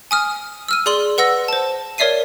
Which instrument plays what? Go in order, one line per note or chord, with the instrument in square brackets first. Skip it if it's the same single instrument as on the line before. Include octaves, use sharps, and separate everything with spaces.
[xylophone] G#5 D#6 F6
E6 F6 D#7
G#4 D5 C6 F#7 G7
B4 F#5 E6 A#6
C5 A5
A#4 C#5 D5 E5 C7 D#7